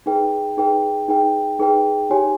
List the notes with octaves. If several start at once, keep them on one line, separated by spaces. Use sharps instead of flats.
D#4 G#4 B4 G5
D#4 G#4 B4 G5
D#4 G#4 B4 G5
D#4 G#4 B4 G5
D#4 G4 C#5 G#5